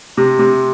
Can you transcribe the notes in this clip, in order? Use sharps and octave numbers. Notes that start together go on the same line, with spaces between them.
C3
C3